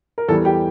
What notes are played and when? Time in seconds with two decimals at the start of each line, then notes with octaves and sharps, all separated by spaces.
0.18 A#4
0.28 E2 E3 G3 A4
0.45 G4